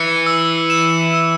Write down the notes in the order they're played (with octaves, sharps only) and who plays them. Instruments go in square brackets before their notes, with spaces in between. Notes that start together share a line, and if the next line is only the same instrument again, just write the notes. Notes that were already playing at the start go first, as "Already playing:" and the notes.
Already playing: [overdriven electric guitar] E3 [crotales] C#7
[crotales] E6
E7
E6